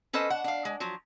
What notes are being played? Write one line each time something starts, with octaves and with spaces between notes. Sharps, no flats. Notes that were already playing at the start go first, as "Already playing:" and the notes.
C#4 A4 B4 C5 D#5
D4 F#5
D4 F5
G#3
F3 F#3